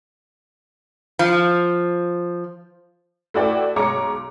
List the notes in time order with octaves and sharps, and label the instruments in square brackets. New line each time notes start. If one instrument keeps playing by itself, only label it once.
[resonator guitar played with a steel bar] F3
[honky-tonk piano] A3 E4 F#4 B4 D5 G5
B1 G#3 C#5 A#5 D6 C#7